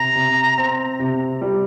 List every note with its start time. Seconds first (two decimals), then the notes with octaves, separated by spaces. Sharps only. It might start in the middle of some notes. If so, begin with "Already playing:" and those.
Already playing: C3 A#5
0.15 C3
0.58 C4
1.00 C3
1.41 G3